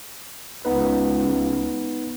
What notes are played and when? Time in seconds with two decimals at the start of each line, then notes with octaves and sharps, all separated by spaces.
0.65 C#2 B3 D#4 B4